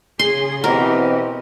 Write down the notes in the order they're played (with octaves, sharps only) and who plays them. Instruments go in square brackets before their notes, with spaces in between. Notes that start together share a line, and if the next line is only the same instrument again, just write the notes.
[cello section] C#3 G#4 [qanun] C6
[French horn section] B2 E3 C4 [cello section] F#4 G4 D#5 [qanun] A#4